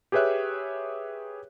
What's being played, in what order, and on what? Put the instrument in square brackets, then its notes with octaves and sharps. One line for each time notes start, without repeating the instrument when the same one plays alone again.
[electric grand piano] G4 G#4 B4 C#5 E5 F#6